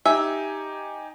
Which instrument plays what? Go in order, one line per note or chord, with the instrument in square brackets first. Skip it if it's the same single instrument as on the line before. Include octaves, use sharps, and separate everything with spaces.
[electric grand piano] D#4 G4 G#5 [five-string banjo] E5